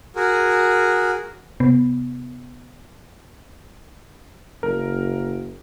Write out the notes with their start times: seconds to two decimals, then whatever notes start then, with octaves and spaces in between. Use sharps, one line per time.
0.16 F#4 G#4 A#4
1.60 C3 B3
4.63 F#1 A#4